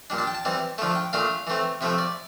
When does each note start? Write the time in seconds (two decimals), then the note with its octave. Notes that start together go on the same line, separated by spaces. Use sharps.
0.10 A#2 G3 D4
0.18 A5
0.27 G5
0.35 A5
0.45 E3 G3 C4
0.78 D3 F3 A3 A5
0.95 G5
1.13 A#2 A3 D4 F5
1.47 E3 A3 C4
1.81 C3 F3 A3 E5
1.98 D5